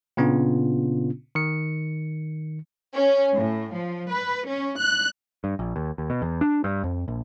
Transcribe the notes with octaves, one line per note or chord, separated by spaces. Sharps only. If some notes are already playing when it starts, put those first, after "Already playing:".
A#2 C#3 B3 C#4 D4 F4
D#3 C#7
C#4
A2
F3
B4
C#4
F#6
G2
A#1
D#2
D#2
B2
E2
D4
G2
F2
A#1